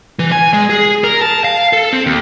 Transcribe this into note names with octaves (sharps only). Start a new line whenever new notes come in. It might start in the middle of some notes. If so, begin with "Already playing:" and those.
E3
G#5
G#3
G#4
A#4
A5
F5
A4
C4
D#2